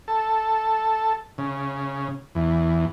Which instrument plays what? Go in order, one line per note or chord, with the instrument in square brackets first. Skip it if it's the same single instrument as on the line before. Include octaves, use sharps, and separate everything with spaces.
[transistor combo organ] A4
C#3
E2